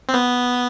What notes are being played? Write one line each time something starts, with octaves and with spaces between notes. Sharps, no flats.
C4
B3